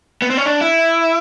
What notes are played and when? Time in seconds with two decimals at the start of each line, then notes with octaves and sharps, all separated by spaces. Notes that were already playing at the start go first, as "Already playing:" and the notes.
0.22 B3
0.30 C4
0.37 C#4
0.46 D4
0.61 E4